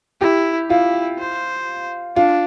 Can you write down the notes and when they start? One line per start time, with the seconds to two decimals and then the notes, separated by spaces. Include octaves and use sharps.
0.21 E4 G4
0.70 E4 F4
1.19 C5
2.16 D4 F4